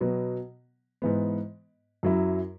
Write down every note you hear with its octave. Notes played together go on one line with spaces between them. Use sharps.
B2 F#3 B3
G#2 E3 B3
F#2 F#3 E4